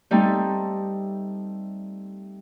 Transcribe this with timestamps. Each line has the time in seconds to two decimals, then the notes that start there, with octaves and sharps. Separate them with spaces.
0.11 G3 A3 C4 D#4